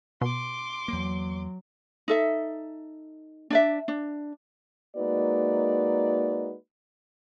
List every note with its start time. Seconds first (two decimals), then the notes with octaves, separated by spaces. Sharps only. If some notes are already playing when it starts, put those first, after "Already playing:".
0.21 B2 C6 D6
0.88 E2 F#3 A#3
2.08 D#4 A4 E5
3.50 D4 D5 E5
3.88 D4
4.96 G#3 A#3 D#4 F#4 B4 D5